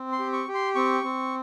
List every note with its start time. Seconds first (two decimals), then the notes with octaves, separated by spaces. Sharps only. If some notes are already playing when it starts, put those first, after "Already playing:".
Already playing: C4
0.12 C6
0.19 G4
0.33 C#6
0.48 G4
0.54 C6
0.75 C4 C#6
1.04 C4